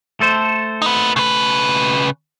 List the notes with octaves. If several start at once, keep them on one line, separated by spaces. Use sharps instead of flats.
A3 A4 C5
D#4 B4
C#3 B4